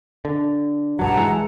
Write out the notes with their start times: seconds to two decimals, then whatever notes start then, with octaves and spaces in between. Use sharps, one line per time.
0.25 D3
0.99 B1 G2 F#3 F#5 A5 A#5
1.16 E3 G#3